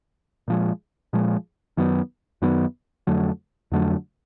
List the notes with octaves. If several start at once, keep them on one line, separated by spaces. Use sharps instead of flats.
A#2 F3 G#3
A#2 F3 G#3
F#2 D#3 F#3 B3
F#2 D#3 F#3 B3
F2 D3 F#3 A3
F2 D3 F#3 A3